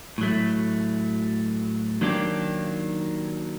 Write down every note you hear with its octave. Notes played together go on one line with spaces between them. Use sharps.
A2 F#3 A3
D#3 F#3 A#3 D4 G4